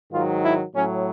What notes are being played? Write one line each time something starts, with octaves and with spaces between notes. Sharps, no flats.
G#2 D#3 F#3 F4
E4
A2 F#3 C#4